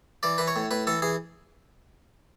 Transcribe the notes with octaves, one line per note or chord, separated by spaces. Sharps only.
E3 D5
E3 B4
C#5
A2
A2 B4
E3 A4
E3 G#4